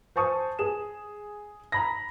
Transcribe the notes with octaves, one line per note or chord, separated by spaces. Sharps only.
C5 G#5 A5 C#6 D#6
G#4 E7
A#5 B5 A#6